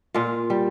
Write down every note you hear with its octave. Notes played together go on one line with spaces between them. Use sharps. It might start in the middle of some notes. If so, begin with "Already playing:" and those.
A#2 F4
G3